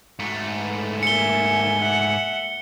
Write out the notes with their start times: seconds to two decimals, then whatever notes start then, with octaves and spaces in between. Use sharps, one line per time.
0.19 G#2 A3 F#4
0.59 B4
1.03 A#3 E5 G#5 C#7 G7
1.79 E5 F#5